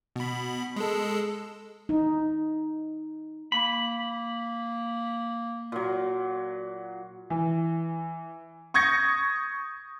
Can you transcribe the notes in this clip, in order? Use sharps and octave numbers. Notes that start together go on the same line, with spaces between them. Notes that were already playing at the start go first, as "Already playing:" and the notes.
B2 B5
G#3 A4
D#4
A#3 B5
A#2 F#3
E3
C#6 D#6 G6 G#6 A#6 C#7